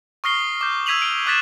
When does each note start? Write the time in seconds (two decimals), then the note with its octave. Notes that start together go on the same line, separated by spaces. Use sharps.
0.24 C#6 D#6 F6 A#6 C7 G7
0.61 D6 G6
0.86 E6 G#6 B6 D#7 F7 F#7
1.02 D7 G7
1.26 D6 F#6 G#6 A6 B6 E7